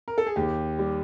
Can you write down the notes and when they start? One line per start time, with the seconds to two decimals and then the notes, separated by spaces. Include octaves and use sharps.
0.08 A#4
0.18 A4
0.26 G#4
0.36 D#2 G4
0.79 G3